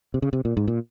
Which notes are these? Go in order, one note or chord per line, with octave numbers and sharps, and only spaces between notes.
C3
C#3
C3
A#2
G#2
A#2